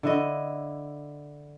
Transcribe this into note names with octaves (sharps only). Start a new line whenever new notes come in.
D3 E4 D#5